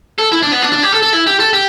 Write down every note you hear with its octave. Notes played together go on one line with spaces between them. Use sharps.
A4
E4
D4
B3
D4
D4
G4
A4
A4
E4
G4
A4
G4